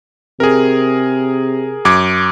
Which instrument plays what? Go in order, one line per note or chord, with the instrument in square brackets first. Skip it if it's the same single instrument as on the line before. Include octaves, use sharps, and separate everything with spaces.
[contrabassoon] C3 [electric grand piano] G#4 A#4
[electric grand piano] F#2 D6 G#6